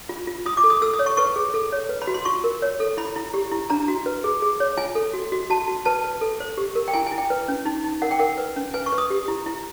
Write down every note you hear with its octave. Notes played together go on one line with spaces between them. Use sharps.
F4
F4
F4 D#6
D6
A4
D#6
A4 E6
D#6
C#5
C#6
B4 C#6
G#4
A4
C#5
B4
B5
F#4
C6
F4 C#6
A#4
C#5
A4
E4 B5
E4
G4
E4
D4 A#5
F#4
B4
G#4
G#4
C#5
F4 G#5
A4
F#4
F#4
F#4 A5
F#4
B4 A5
B4
A4
C5
G4
A#4
G5
E4 G#5
G#5
E4
G5
B4
C#4
D#4
D#4
A#4 F#5
G5
A#4 F#5
B4
C#4
B4 G#5
C#6
B4
D#6
G4
E4
E4